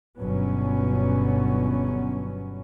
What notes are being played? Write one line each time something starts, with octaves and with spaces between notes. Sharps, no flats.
G1 B2 F#3 B3 C#4